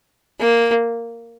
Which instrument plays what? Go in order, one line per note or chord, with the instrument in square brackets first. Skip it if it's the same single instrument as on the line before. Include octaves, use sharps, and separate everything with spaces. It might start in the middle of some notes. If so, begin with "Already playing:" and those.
[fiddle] A#3